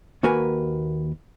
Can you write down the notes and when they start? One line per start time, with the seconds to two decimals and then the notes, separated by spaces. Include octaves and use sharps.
0.23 D#2 A#3 F#4 A#4 B4 G#5